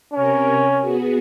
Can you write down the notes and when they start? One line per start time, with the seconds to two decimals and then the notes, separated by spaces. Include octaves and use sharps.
0.14 C3 C#4 A#4 C#5
0.82 B3 F#4 G#4